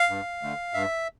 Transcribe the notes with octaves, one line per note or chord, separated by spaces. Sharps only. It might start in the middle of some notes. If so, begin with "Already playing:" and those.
Already playing: F5
G2
D3 A3
G2 E5